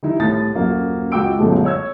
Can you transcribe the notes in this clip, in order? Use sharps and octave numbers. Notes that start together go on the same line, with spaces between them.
D#3 G3 D#4 E4
C2 A2 D#6 A6
D#1 F#2 A#3 F#4
C#2 F#4 G5 D6 E6 D7
G1 F#2 B2 G#3 A3
C#5 E6 G#6